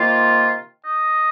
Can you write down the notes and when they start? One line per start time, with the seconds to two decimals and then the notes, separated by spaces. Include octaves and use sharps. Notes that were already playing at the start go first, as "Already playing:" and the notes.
Already playing: C3 D#3 A#3 F4
0.85 D#5